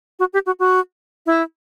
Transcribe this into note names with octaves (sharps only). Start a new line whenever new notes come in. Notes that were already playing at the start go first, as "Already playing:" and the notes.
F#4
G4
F#4
F#4
E4